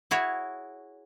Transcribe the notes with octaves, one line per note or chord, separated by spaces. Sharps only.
E4 F#4 G#4 C#5